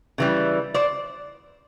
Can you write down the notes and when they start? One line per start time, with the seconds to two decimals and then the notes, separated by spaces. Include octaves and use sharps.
0.18 C#3 E3 G3
0.74 C5 D5